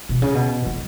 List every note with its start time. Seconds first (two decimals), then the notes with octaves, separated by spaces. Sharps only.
0.09 B2
0.22 C#3
0.34 B2
0.66 F3